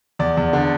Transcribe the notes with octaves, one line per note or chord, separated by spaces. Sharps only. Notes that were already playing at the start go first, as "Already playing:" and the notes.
E2 D5
E2
D3